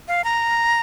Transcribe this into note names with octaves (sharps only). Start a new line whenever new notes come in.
F5
A#5